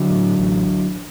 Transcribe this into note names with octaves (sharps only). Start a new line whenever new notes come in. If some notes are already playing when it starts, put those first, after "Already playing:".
Already playing: D3 F#3
A2
A1